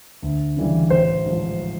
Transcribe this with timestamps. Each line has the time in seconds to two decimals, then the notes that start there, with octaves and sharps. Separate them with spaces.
0.22 D2
0.57 C#3 E3 G3
0.90 A1 C5
1.25 G#2 F3